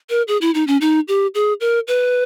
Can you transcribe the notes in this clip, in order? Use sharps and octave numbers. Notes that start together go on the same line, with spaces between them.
A#4
G#4
E4
D#4
C#4
D#4
G4
G#4
A#4
B4